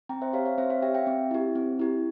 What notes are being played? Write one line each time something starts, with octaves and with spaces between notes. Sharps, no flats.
C4 G5 A#5
C5 E5
G4 C#5 F5
C#5 F5
C4 C5 E5
C#5 F5
G4 E5 G5
E5 G5
C4
E4 G4
C4
E4 G4